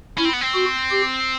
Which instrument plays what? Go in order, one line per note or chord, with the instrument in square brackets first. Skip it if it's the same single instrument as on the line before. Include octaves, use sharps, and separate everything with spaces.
[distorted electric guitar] C#4 [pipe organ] E4
[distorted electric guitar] C4
B3
C4
[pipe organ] F#4
G4